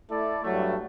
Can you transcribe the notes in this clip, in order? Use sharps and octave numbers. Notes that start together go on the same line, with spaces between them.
A3 E4 A4 D5
G2 F#3 A3